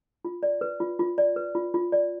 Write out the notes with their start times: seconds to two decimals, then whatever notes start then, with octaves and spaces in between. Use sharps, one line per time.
0.25 F4
0.43 D5
0.61 B4
0.80 F4
0.99 F4
1.18 D5
1.36 B4
1.55 F4
1.74 F4
1.92 D5